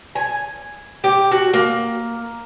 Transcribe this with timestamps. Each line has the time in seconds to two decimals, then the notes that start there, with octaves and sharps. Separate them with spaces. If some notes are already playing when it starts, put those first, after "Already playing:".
0.15 G#5
1.04 G4
1.31 F#4
1.54 A#3